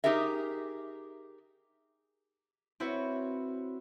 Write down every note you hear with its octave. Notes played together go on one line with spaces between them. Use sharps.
D#4 G4 G#4 A#4 E5
C4 E4 F#4 B4 C#5